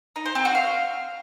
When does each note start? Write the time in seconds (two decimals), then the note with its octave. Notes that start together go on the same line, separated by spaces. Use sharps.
0.16 D#4
0.25 C5
0.35 C4
0.45 F#4
0.55 F5